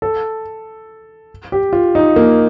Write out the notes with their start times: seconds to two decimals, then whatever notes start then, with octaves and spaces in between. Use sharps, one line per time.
0.02 A4
1.52 G4
1.73 F4
1.95 D#4
2.16 A#3